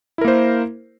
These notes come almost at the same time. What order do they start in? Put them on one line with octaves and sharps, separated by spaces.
E4 A#4 A#3 C5